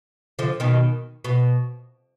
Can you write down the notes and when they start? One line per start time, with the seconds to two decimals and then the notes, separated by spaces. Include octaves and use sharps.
0.39 D3 F3
0.60 B2 D#3
1.24 B2